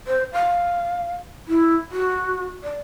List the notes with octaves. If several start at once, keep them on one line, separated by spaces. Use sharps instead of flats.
C5
F5
E4
F#4
D5